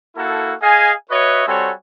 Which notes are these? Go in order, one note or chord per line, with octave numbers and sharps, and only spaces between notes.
A#3 E4 F#4 A4
G#4 D#5 F5 G#5
F#4 B4 C#5 D#5 E5 C#6
G3 C4 F#4 A4 C#5 G#5